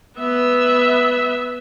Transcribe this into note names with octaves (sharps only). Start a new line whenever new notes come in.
B3 E5